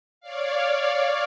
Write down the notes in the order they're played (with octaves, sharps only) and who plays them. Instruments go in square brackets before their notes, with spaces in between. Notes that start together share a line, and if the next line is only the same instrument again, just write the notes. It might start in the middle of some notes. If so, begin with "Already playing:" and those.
[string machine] C#5 D5 F5